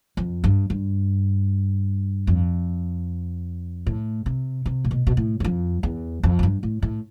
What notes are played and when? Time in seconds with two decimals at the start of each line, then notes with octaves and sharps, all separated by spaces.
0.17 F2
0.44 G2
0.70 G2
2.27 F2
3.87 A2
4.26 C3
4.66 C3
4.85 A2
4.91 B2
5.07 B2
5.17 A2
5.40 G2
5.44 F2
5.83 E2
6.23 F2
6.39 A2
6.43 G2
6.63 A2
6.82 A2